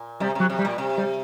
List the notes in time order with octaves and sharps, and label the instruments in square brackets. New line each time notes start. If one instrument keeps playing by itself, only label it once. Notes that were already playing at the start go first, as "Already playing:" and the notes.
Already playing: [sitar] A#2
[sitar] C3 [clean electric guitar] G3
[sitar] C3 [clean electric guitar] F#3
[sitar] C3
[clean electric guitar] G3
[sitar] A#2
C3
[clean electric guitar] G3